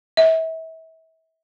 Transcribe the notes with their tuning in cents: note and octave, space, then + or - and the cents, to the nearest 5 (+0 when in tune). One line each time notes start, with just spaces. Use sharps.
E5 -35